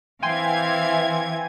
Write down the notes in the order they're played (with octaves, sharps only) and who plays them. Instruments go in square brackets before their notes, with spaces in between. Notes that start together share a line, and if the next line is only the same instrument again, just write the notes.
[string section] E3 G#6 [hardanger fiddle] C4 F5 [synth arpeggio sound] G5 G#5 C6